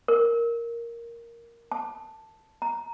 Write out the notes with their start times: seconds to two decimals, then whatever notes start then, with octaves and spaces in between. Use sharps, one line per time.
0.08 A#4
1.72 A5
2.62 A#5